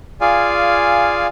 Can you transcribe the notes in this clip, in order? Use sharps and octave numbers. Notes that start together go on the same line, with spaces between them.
F4 G#4 D5 F5 G#5